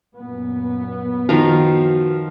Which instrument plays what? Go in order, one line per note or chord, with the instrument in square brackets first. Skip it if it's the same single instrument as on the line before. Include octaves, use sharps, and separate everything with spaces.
[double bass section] F#2 A#2 B3
[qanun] D#3 F4 [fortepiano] F3 [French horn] F#4